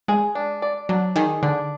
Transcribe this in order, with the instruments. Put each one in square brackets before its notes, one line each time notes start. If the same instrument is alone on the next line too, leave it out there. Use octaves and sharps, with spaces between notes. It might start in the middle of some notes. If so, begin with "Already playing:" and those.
[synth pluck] G#3 [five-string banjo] G#4
[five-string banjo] D4
D5
[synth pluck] F#3 [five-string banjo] D4
[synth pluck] D#3 [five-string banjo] G#4
[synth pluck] D3 [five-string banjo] D4